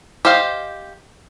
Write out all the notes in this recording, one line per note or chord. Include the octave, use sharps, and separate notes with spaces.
G4 C5 D#5 F5